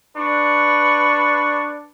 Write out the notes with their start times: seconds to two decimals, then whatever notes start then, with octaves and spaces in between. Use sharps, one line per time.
0.17 D4 B4 C#6